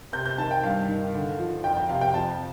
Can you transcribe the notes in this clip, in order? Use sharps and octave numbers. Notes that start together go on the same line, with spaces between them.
C3 G6
G6
D#3 A5
G5
G2 F5
D#3
D3
F3
F2 G5
G5
C3 F5
G5
F2 A5